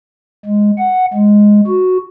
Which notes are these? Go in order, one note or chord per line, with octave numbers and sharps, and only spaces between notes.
G#3
F#5
G#3
F#4